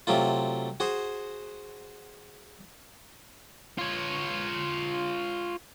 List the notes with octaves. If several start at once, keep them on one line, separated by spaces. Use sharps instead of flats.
C3 F#3 A3 F4
F#4 G#4 C5
F4 C#5